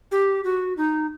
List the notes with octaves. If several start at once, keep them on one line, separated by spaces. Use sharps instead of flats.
G4
F#4
D#4